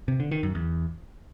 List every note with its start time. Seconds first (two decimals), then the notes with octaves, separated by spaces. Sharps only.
0.08 C3
0.20 D3
0.31 D#3
0.43 F#2
0.55 E2